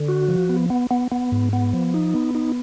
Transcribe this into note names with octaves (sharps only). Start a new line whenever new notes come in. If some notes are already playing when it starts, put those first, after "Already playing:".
Already playing: D3
F#4
F3
B3
B3
B3
B3
G#2
B3
F3
D#4
B3
D#4